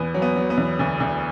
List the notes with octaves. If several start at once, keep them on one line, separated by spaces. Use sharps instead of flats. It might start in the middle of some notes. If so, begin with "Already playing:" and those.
Already playing: E2 B3
F#3
B3
F#3
B3
E2
D2
D2